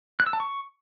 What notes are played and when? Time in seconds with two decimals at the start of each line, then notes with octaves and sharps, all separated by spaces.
0.20 F#6
0.26 E6
0.33 A5
0.40 C#6